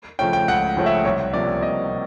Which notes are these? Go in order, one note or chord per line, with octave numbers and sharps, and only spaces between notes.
C#3 F3 A3 C#4 G5
G5
C#2 F#5
C#3 F3 A3 C#4
E5
C2 C#5
C3 F3 A#3 C#4 D5
C2 D#5
C3